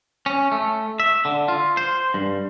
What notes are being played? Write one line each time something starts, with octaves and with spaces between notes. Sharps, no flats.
C#4
A3
E5
D3
F4
C5
G2